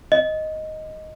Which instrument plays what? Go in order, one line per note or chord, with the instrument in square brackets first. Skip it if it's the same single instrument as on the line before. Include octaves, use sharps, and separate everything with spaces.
[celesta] D#5